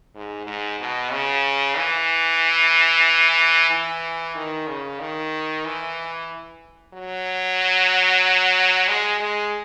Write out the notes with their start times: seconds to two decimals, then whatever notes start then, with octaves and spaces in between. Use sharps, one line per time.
0.15 G#2
0.47 G#2
0.80 B2
1.12 C#3
1.77 E3
3.71 E3
4.36 D#3
4.68 C#3
5.00 D#3
5.65 E3
6.94 F#3
8.89 G#3
9.20 G#3